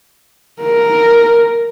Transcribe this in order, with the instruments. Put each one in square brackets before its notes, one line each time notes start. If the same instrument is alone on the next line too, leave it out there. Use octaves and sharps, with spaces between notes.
[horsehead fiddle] A#4